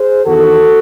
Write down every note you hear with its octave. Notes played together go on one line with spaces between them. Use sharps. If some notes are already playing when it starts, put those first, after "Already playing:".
Already playing: G#4 C5
E2 D#3 F#4 A4